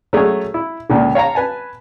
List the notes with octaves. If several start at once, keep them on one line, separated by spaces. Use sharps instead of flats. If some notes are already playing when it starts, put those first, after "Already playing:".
F#3 A3 C#4 F#4 G#4
E4
C#2 A#2 D3
C#5 F5 A5 A#5
B4 G#5 A5